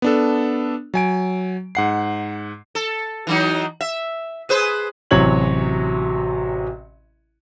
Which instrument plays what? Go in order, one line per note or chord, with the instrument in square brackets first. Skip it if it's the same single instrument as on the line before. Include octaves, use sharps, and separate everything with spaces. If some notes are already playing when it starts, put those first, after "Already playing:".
[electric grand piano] B3 D4 A4
F#3 G#5 D7
G#2 F#5 C7
[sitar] A4
E3 F#3 D#4
E5
G#4 B4 C5
[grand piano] A1 C3 F#3 C#5 G#6 F#7